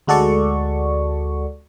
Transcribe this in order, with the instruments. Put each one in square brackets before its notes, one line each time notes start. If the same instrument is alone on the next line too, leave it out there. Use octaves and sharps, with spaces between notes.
[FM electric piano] D2 G#3 F#4 A4 D5 C#6